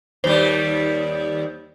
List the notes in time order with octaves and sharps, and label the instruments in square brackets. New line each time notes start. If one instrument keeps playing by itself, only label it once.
[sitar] D#2 G3 [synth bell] C5